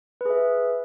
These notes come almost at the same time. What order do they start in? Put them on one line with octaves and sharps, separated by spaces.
B4 G#4 E5